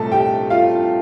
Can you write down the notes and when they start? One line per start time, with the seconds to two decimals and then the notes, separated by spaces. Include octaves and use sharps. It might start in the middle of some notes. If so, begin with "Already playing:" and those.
Already playing: C2 A#2 A3 A4 A5
0.12 G4 G5
0.50 F4 F5